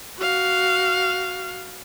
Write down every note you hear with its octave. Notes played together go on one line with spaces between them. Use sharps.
F#4 F5